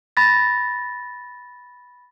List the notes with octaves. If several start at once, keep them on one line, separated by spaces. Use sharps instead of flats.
B5 A6 A#6